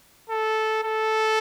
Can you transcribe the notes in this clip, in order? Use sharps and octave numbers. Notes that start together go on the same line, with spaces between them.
A4
A4